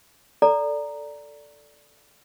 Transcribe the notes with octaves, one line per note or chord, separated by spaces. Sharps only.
A4 D5 A#5